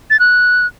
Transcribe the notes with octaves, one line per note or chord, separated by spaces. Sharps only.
A6
F#6